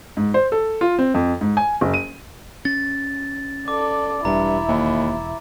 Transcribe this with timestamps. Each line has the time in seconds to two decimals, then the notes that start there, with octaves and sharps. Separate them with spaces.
0.17 G#2
0.34 C5
0.52 A4
0.81 F4
0.99 C4
1.14 F2
1.41 G#2
1.57 G#5
1.81 F#1
1.94 D#7
2.65 C#4 A6
3.68 A4 D5 D6
4.25 E1 G2 E4 E5 A#5
4.68 D#2